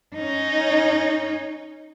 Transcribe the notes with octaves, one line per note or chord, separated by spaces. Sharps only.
C#4 D#4